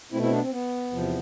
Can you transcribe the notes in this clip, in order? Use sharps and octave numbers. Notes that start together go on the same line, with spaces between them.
B2 A3 C4 E4
C4 E4
B3 D4
C4
B3
E2 C3 F3